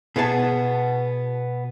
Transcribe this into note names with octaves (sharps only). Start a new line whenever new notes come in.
B2 B3 G#4 A5